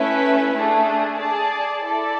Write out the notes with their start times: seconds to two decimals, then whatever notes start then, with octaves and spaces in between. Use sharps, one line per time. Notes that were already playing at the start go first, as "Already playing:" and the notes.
Already playing: A3 C#4 E4 B4 E5
0.54 A3 D4 G#4
1.18 G#4 D5 A5
1.82 E4 A4 D5